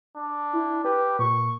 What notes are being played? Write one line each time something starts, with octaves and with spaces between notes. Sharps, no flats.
D4
E4
G4 B4
A#2 C#6